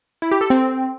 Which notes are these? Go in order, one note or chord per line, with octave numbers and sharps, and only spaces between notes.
E4
G4
A4
C4